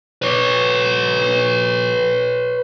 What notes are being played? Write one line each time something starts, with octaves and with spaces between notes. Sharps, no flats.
B4 C#5